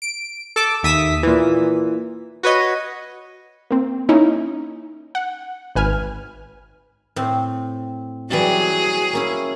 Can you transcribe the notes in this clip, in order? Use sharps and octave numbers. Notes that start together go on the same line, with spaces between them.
D7
A4 A5 D6
D#2 E5 D#6 B6
A#2 E3
F#4 B4 C#5 D#5
A#3 C4
A#3 C#4 D#4 E4
F#5
G#1 B4 G#5 F6
A2 C4
E3 F#3 G3 G#4 A5
A#3 C#4 E4